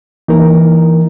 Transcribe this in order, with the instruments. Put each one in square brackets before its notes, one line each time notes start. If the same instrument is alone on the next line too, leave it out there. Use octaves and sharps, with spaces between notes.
[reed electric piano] E3 A#3 D#4 A#4